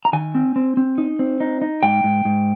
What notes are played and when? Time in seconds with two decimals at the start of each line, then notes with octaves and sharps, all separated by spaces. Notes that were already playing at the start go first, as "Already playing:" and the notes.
0.05 A#5
0.13 D#3 G#5
0.35 C4
0.56 C4
0.77 C4
0.98 D#4
1.19 C4
1.40 D#4
1.62 D#4
1.83 G#2 G5
2.04 G#2
2.25 G#2